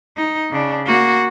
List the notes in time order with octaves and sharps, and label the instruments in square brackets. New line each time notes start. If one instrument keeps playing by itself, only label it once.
[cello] D#4
C#3 D4
A#3 F#4